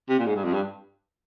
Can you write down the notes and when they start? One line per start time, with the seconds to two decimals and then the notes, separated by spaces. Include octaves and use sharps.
0.09 C3
0.19 A#2
0.26 G#2
0.36 G2
0.44 F2
0.54 G2